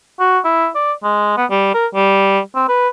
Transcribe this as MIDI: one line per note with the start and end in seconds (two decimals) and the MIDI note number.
0.20 0.39 66
0.44 0.68 64
0.75 0.92 74
1.03 1.34 56
1.37 1.45 59
1.50 1.70 55
1.74 1.87 70
1.94 2.40 55
2.55 2.68 60
2.68 2.89 71